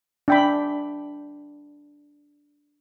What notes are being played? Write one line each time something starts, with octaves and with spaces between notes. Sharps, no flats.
D4 G5 B5